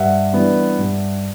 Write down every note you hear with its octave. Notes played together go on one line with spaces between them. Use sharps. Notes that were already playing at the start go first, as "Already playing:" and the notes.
Already playing: G2 E5 F#5
E3 G3 B3 D4
G2